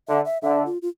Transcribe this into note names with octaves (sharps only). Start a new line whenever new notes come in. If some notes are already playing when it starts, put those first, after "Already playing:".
D3 E5
E5
D3 E5
F4
F4